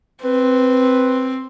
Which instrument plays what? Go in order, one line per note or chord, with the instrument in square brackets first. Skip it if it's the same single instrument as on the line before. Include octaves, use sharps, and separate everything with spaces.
[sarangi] C4 [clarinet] B4